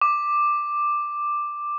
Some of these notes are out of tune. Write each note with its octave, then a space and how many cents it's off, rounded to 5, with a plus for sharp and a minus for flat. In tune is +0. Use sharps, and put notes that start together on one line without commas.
D6 +10